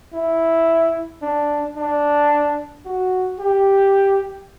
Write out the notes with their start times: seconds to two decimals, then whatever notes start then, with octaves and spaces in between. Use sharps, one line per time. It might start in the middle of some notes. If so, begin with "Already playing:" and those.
0.14 E4
1.22 D4
1.77 D4
2.85 F#4
3.39 G4